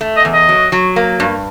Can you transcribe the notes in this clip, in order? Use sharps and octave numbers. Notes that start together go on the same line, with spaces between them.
A3
D#5
E2
D#5
F#3
F#3
A#3
G2